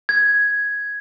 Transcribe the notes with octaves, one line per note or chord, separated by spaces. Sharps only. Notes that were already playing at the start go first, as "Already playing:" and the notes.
G#6